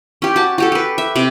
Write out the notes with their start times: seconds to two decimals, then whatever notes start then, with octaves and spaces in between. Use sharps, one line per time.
0.22 C#4 G4
0.36 F#4 A5
0.58 F#4 G4 A4
0.72 G4 B4
0.98 E5
1.16 C3 D6